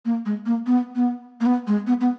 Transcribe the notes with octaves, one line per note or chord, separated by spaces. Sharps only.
A#3
G#3
A#3
B3
B3
A#3
B3
G#3
B3
B3